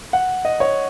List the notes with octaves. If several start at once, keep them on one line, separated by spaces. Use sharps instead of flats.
F#5
D#5
C#5